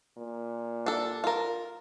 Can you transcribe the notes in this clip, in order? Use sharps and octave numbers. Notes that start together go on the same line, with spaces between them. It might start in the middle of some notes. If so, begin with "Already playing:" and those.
A#2
D4 A4
F4 A#4